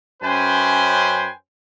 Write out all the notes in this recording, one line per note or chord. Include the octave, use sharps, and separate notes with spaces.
F#2 C#4 B4 C5 G5 G#5